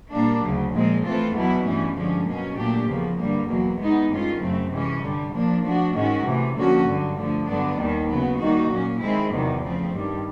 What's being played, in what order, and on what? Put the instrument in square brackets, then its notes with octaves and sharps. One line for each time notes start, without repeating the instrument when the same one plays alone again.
[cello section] A#2 G3 A#3 D4
D2 C#3 F#3
A#2 F3 G#3 C4
E3 A3 C4 F4 A4
E2 B2 F#3 B3 E4
G2 E3 A3 C#4
G2 D3 F3 G#3 C#4
B2 F#3 A#3 C#4
A#2 F#3 A3 D4 G4
E2 C#3 F3 A#3
G2 D3 G3 A#3
E2 B2 F#3 A#3
E3 G#3 B3 D#4
G2 D#3 G#3 C#4 F4
F#2 C#3 F#3 A3 C4
C3 E3 G#3 C#4
G2 D3 G3
A#2 F3 A#3 D4
F3 A3 D4 F#4
G#2 D#3 G#3 C#4 F#4
C3 E3 A3
D3 F3 A#3 C#4 F#4
G2 D3 F#3
D3 F3 A3
G2 D3 F#3 B3 D4
D#2 D#3 G3
C#3 F#3 B3
D#3 G3 A#3 D#4 F#4
A#2 F#3 A#3 C#4
D#3 G#3 C4 E4 G#4
E2 C3 D#3 F#3
C#3 F3 A3 C4
G2 D#3 G3